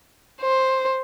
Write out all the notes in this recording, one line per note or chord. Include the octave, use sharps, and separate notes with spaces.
C5